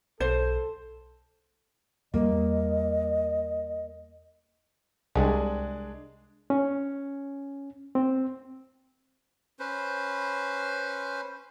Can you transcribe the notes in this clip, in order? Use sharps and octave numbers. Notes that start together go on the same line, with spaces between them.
B1 A4 C5
E2 G3 A#3 D#5
C2 G#3 D4 G#4
C#4
C4
C#4 B4 C5